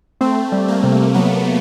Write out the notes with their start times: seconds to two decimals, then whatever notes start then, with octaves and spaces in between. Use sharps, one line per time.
0.21 A3 C4
0.52 G3
0.68 A#3
0.84 C3
1.14 F#3 B3